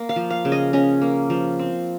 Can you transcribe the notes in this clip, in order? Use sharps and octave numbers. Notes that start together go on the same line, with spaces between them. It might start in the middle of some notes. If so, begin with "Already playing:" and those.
Already playing: A#3
F5
F3
F5
C#3
D#5
C#4 D#5
A#3
F3
C4